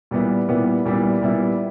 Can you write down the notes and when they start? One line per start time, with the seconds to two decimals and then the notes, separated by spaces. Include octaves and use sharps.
0.11 A#2 G3 B3 E4
0.48 A#2 G3 B3 E4
0.85 A#2 G3 B3 E4
1.21 A#2 G3 B3 E4